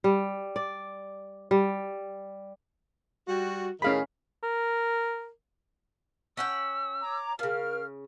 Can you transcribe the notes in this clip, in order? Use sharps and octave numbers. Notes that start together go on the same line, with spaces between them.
G3
D5
G3
G3 F#4
A2 D#3 C#4 G#4 F5 B5
A#4
C#4 F#5 G5 E6
C#5 A#5 D6
A#2 C#3 A#4 F5 F6